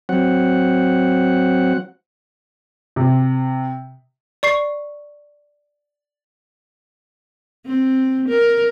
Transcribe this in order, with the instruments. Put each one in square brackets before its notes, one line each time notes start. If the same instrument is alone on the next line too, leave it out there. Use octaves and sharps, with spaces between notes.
[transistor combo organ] F#3 C4 F#5
[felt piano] C3
[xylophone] D5 C#6 C7
[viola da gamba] C4
A#4